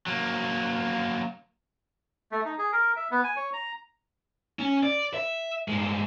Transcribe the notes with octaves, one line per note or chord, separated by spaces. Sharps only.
F#3 A#3
A3
D#4
G#4
A#4
E5
B3
G#5
C#5
A#5
C#4
D5
E5
G2 G#3